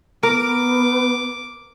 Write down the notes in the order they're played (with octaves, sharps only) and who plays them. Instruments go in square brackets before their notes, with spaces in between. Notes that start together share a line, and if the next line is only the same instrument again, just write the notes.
[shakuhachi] B3 [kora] A#4 [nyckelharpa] D6